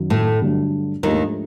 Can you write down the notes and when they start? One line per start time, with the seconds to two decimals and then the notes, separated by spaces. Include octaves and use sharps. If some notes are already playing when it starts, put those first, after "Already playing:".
Already playing: F#2 D#3 F#3
0.10 A2 A3
0.41 G2 D3 F#3 A3 D4
1.03 D#2 G#2 D#3 F3 A3 D4 G4